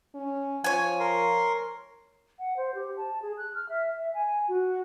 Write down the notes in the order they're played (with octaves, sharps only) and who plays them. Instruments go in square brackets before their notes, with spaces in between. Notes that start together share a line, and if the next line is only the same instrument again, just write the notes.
[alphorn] C#4
[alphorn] F3 [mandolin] C#5 G#5
[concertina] A#4 C6
[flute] F#5
C5
G4
A5
G#4
F#6
F6
E5
E5
G#5
F#4